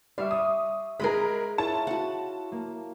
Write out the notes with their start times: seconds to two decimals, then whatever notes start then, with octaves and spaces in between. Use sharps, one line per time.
0.18 G3 D5 E5 F5 C#6
0.31 D#6
1.00 G#3 G#4 A#4 D#5 B5
1.58 E4 F4 C#5 A5
1.87 F#4 F#5
2.52 A#3